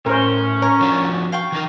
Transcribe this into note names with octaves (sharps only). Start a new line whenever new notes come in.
A2 C#4 A#4 C5
A#4 C#5
F3 D4 F#4
F5 G5 C#6
E3 D#4 A#4